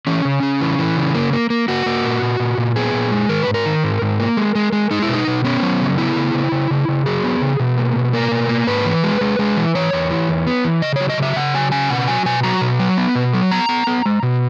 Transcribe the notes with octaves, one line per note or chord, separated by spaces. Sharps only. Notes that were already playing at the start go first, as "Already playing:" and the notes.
E3 C#4
C#3
C#3
E3
E3
C#3
A#3
A#3
A#3
A#3 F#4
A#3
A#2
A#2
A#2
A#2
B3 G#4
A#2
G#3
D#3 A#4
B4
G#2
A#4
D#3
G#2
G#2
A#3
G#3
G#3
G#3
G#3 D#4
E4
B2 D#4
B2
B3 C#4
F#3
C#3
B3 E4
C#3
C#3
C#3
C#3
C#3
F#3 G#4
B3
C#3
B2
A#3
B2
A#3 A#4
B2
A#3
G#2 B4
E3
G#3
G#3
G#3
E3
E3 C#5
E2
E3
E2
B3
E3
C#3 D#5
F#3 C#5
D#5
C#3 E5
C#3 F#5
F#3 G#5
C#3 G#5
B2 F#5
F#3 G#5
B2 G#5
F#3 A#5
B2
F#3
B3
B2
F#3
B3 A#5
B3
B3
G#3
B2